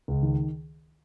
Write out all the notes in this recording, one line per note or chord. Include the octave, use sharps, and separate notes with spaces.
C#2
D#3